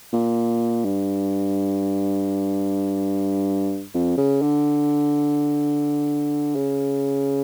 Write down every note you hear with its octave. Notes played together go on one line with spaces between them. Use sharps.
A#2
G2
F2
C#3
D3
C#3